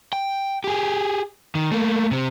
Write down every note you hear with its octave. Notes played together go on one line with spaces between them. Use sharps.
G5
G4 G#4
D#3
A3 A#3
C3 C4